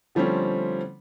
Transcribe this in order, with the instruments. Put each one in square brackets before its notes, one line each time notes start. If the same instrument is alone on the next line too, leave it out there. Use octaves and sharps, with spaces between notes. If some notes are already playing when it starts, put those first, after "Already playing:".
[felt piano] D3 F3 G3 A3 C4 C#4